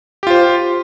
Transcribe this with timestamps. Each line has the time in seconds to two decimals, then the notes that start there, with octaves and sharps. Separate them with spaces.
0.23 G4
0.27 F4
0.30 C5